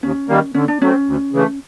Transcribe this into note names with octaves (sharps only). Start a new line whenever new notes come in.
D#2 C#4
D#3 G3 A#3
D3 C#4
D4
F#3 A3 C4 C#4
D2
C#3 E3 A3